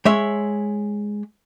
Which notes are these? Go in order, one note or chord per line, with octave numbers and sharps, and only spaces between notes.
G#3 C#5 E5